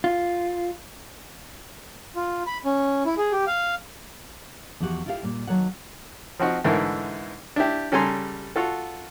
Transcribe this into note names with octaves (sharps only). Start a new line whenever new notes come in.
F4
F4
B5
C#4
E4
G#4
G4
F5
E2 F3 F#4 G4 F#5
E4 F4 G4 A4 C#5 F5
A#2 G3
D#2 F#3 A4 C#5 F#5
F3 C4 D#4 F#4
G#2 D3 E3 A3 A#4
D4 E4 G4
C#3 G3 A4 G#5 A#5 C6
F4 F#4 A4